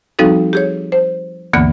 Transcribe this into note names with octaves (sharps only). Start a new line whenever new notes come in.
F3 G3 C4 D#4 F#4 A4
G4 G#4 C#5
C5
D2 G2 D3 E3 A#3 B3